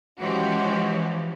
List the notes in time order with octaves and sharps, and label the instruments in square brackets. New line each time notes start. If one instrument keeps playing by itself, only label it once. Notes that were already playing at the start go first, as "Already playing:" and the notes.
[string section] E3 F3 [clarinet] G#3 [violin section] C#4 F#4 G4